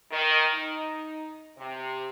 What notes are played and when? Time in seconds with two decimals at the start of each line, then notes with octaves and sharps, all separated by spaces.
0.11 D#3
0.54 D#4
1.57 C3